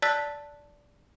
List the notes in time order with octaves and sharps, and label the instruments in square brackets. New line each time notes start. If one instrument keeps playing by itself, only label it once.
[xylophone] D5 A5 E6 F#6 A6 B6